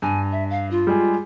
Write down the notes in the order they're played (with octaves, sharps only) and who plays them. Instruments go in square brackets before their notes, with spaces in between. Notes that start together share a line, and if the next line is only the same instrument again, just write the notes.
[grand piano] G2 [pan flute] G#5
[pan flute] E5
F5
F4
[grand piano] G3 G#3 G#4